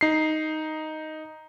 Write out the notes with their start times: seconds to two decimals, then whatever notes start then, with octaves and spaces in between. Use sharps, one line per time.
0.01 D#4 C7